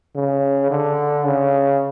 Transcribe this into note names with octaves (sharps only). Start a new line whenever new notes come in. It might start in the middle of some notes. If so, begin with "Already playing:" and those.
C#3
D3
C#3